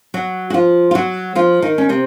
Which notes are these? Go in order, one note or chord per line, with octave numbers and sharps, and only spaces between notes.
F#3 F#4
F#4
F3 F4
F4
F#3 F#4
F3 F4
D#3 D#4
C#4
C3 C4